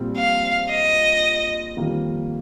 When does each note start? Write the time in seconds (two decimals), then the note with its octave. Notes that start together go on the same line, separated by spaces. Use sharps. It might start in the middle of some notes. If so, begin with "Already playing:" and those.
Already playing: A#1 A#2 G3 C4
0.17 F5
0.70 D#5
1.77 F2 D#3 G3 A#3